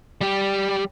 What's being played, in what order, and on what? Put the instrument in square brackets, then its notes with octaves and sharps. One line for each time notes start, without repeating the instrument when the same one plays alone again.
[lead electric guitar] G3 G4